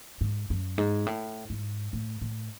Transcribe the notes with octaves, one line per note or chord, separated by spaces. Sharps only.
G#2
F#2
G#2
A2
G#2
A2
A2